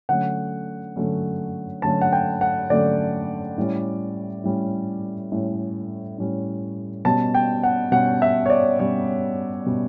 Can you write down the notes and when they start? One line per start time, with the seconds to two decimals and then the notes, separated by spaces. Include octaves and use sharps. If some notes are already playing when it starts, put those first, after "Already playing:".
0.09 D3 F#3 A3 C#4 F#5
0.96 D3 F#3 A3 C#4
1.82 D3 F#3 A3 C#4 A5
2.01 F#5
2.13 G5
2.41 F#5
2.70 D3 F#3 A3 C#4 D5
3.58 A2 G3 C#4
4.44 A2 G3 C#4
5.31 A2 G3 C#4
6.18 A2 G3 C#4
7.05 B2 G3 C#4 A5
7.34 G5
7.63 F#5
7.92 B2 G3 C#4 F#5
8.22 E5
8.46 C#5
8.50 D5
8.79 B2 G3 C#4 C#5
9.66 B2 G3 C#4